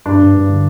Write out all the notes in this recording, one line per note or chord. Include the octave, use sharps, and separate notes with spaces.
G2 D4
G2
G2
D3